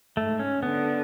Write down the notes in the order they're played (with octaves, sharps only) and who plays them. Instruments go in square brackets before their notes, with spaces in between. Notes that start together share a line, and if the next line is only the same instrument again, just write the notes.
[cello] G#2 [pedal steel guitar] A3
[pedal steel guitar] C#4
[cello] D3 [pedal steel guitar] B3